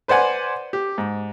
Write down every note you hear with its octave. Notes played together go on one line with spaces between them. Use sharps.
B4 C5 D5 F#5 G#5
G4
G#2